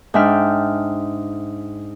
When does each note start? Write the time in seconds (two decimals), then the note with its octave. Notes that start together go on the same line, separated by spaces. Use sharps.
0.14 G#2 D4 E5 G5 F6